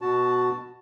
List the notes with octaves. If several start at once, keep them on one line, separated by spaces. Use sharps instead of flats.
B2 F#4 A5